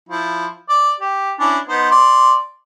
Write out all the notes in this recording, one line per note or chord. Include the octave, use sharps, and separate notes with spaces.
F3 E4
D5
G4
C#4 D4 E4
B3 D#4 C5
D5 C6